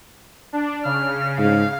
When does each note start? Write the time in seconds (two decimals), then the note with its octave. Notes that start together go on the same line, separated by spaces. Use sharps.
0.53 D4
0.85 C#3 F6
1.38 G#2 F5